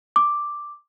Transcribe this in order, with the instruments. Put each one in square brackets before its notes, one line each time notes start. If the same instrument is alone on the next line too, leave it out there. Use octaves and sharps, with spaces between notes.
[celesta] D6